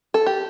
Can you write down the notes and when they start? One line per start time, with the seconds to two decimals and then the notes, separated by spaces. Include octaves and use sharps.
0.14 A4
0.26 G4